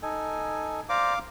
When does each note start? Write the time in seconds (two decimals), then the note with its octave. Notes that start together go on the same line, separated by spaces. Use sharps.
0.02 D#4 A4 G#5
0.89 C5 D5 F5 A#5 D6